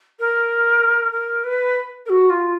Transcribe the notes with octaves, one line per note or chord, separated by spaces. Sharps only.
A#4
A#4
B4
A#4
F#4
F4